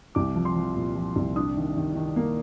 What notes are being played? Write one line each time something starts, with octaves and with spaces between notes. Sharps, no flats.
C2 D6
F3
C6
F3
A#2
F3
C2
D4 D#6
D#3
D#3
D#3
A#3